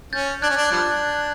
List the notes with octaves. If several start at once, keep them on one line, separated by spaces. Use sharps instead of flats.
C#4 G6 A6
D4 F#6 G#6
C#4
D4
F#6
F3 G3 D4 G6